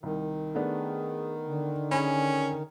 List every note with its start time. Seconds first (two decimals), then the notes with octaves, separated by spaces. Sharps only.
0.03 C2 D#3
0.55 A3 B3 D4 G#4
1.47 D3
1.91 C#4 G#4 G#5 B5